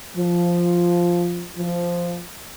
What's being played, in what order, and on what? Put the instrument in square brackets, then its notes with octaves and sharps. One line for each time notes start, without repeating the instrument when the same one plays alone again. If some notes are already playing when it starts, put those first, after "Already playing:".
[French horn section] F3
F3